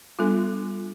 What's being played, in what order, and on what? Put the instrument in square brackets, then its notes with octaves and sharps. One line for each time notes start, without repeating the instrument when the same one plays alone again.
[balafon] G3 B3 D4 F4 A4